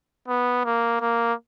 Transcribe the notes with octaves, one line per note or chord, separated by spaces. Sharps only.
B3
A#3
A#3